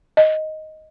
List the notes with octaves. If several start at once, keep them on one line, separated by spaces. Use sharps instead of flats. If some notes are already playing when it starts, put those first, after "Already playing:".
D#5